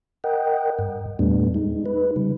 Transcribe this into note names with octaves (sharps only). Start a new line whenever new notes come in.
A#4 D#5 F#5 G5
G2
E2 A#2 G3 A3 B3 D4
G#3 D#4
D#4 B4
C#3 G3